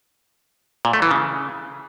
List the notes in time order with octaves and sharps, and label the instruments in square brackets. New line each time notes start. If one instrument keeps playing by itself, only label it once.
[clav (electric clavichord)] A#2
A3
E3
C#3